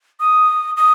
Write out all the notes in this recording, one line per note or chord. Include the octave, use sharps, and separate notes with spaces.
D#6
D#6